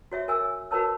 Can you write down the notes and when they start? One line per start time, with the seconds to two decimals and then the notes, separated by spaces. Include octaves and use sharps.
0.12 F#4 C#5 E5
0.28 A#4 G#5 E6
0.71 F#4 A#4 B4 C#5 A5 E6